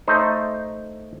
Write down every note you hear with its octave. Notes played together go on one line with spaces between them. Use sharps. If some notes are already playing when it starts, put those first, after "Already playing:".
A3 D#4 C5